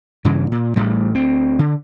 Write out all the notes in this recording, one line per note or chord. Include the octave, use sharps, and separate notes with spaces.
G2 C#3 E3
A#2
A1 A2 G3
D2 C4
D3